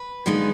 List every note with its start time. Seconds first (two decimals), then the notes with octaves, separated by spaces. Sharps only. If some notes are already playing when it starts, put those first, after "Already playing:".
Already playing: B4
0.26 D3 F3 G#3 B3 D#4